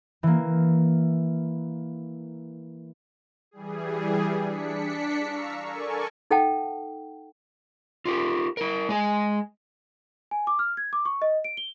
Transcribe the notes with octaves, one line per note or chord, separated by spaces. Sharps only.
E3 A#3
E3 G3 G#4
D4 B6 C#7
F5 A#5 C#6 E6
A4 A#4 D5 G#5 C#6
D#4 A4 F#5 G5 A5
F4 G4 A#4
E4 A#4
G#3 D#5 G#5
G#5
D6
F6
G#6
D6
C#6
D#5
D7
G7